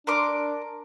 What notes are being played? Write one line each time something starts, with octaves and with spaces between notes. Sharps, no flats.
D4 A#4 C6 D6